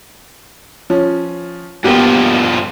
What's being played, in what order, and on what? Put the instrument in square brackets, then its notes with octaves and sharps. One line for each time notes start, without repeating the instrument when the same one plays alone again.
[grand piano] F3 C#4
[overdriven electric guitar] G2 F3 [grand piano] A#3 B3 G4